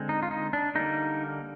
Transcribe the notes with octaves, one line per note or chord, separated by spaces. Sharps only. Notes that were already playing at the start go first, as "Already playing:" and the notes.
Already playing: D3 G#3 C4
D#4
F4
D#4
D4
D3 G3 A#3 D#4